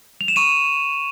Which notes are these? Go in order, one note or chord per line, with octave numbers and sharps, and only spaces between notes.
F7
E7
C#6 D#7